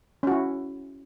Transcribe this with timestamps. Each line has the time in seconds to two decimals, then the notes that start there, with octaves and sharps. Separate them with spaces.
0.23 C#4
0.27 F#4
0.31 E4